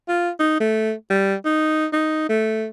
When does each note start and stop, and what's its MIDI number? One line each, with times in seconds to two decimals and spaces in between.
0.08 0.30 65
0.39 0.57 63
0.60 0.92 57
1.10 1.35 55
1.45 1.86 63
1.93 2.26 63
2.29 2.67 57